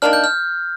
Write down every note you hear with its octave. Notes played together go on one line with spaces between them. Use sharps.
D#3 A#3 D4 F6
G6
F6